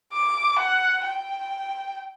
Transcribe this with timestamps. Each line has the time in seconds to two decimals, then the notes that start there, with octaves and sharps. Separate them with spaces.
0.13 D6
0.59 F#5
1.04 G5